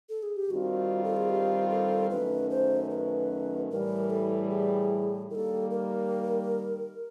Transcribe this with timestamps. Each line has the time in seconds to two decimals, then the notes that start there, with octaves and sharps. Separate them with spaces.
0.09 A4
0.23 G#4
0.36 G4
0.50 G2 D#3 G3 C4 F4 F#4
1.04 A4
1.17 G#4
1.29 G4
1.70 A4
2.10 F#2 D#3 F#3 A3 C#4 B4
2.51 C5
2.90 B4
3.70 A2 E3 G3 A#4
4.10 A4
4.50 G#4
5.30 D#3 G3 A#3 A4 A#4
5.71 A#4